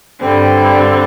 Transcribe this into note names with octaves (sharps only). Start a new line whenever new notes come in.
G2 D3 G3 C4